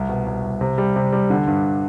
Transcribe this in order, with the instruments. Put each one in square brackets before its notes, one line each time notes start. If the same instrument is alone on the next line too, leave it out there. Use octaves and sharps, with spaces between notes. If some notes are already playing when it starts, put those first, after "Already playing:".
Already playing: [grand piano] C2
B2
C2
C2
C3
G3
C3
G3
D3
G2